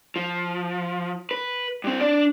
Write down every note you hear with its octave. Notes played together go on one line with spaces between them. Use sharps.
F3
B4
G2 C4
D4 D5